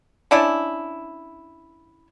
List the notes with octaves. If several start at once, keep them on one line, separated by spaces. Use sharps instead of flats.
C#4 D4 E4